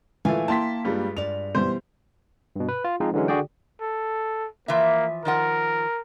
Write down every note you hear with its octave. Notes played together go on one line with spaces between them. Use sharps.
A#2 E3 A3 F4 F5 G#5
A#3 E4 G5 A5 C6 B6
G2 G3 G#3 F4
G2 D5 F7
B2 E3 G3 C5
G2 B2
B4
F4
F3 G#3 C4 D#4
D3 E3 F#3 G#3 C#4
D3 F#4 G#4 D5 G5
A4
E3 F3 A#3 E5
D#3 F3 A#4 F#5